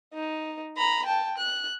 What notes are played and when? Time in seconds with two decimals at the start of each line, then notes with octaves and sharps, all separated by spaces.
0.14 D#4
0.77 A#5 B5
1.06 G5 A5
1.38 F#6